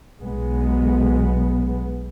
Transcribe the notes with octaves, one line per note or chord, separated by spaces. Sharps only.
B1 G#3 B3